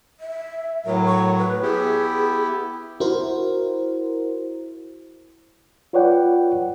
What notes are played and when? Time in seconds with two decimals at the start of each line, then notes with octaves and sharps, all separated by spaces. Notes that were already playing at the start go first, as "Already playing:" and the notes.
0.20 E5
0.86 A2 F#3 A#4
1.05 C#6
1.38 B4
1.63 B3 E4 G4 G#4
3.00 E4 F#4 A#4 C5
5.93 F4 B4 C#5 D5 F#5 G5